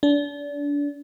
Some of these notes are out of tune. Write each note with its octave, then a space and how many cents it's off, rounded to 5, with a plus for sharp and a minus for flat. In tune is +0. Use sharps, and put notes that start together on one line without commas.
D4 -30